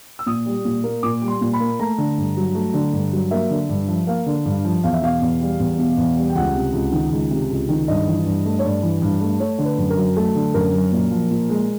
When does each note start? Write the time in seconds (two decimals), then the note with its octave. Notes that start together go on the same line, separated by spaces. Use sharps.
0.19 E6
0.26 A#2 D#6
0.46 G3
0.65 A#2
0.84 A#3
1.03 A#2 D6
1.22 G3
1.28 C6
1.41 A#2
1.53 B5
1.60 A#3
1.79 A3 A#5
1.98 D3
2.18 G2
2.37 F#3
2.55 A3
2.74 D3
2.93 G2
3.13 F#3
3.31 A#3 E5
3.50 D3
3.69 G2
3.88 F3
4.07 A#3 F5
4.26 D3
4.46 G2
4.65 F3
4.84 E2 F5
4.94 E5
5.02 B2 F5
5.22 E2
5.41 G3
5.60 E2
5.78 B2
5.97 E2
6.17 G3
6.29 G5
6.35 C#2 F#5
6.55 C3
6.73 C#2
6.92 D#3
7.12 C#2
7.31 C3
7.50 C#2
7.69 D#3
7.88 G2 D#5
8.07 E3
8.26 G2
8.45 A3
8.59 C#5
8.64 G2 D5
8.83 E3
9.02 G2
9.21 A3
9.40 A3 C#5
9.59 D3
9.65 B4
9.78 F#2
9.90 A#4
9.97 F#3
10.17 A3 A4
10.35 D3
10.54 F#2 A#4
10.73 F#3
10.92 A#2
11.11 F3
11.31 A#2
11.49 G#3